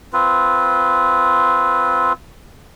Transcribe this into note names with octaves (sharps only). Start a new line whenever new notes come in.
C4 F4 B4